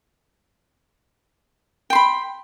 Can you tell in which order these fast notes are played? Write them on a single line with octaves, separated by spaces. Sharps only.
G5 C6 B5